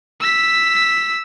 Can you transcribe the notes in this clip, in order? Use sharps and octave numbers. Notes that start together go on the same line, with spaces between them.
E6 B6